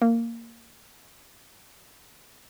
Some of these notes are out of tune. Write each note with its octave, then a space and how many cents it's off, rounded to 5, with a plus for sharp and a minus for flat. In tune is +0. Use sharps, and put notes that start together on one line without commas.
A#3 -10